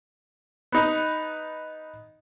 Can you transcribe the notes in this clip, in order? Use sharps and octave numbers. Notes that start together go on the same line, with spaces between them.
B3 D#4